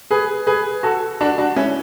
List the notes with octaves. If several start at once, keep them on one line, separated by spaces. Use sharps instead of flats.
G#4 B4
G#4 B4
F#4 A4
D4 F#4
D4 F#4
C#4 E4